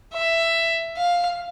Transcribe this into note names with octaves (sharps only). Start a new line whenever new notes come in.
E5
F5